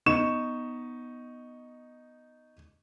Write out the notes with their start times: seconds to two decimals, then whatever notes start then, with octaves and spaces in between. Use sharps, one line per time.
0.06 B3 D#4 C#6 E7